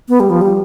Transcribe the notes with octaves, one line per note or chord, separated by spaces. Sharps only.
B3
G3
F3
G3